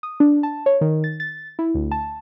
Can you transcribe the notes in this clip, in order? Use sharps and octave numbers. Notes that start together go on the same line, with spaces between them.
D#6
D4
A5
C#5
D#3
A6
A6
E4
D2
A5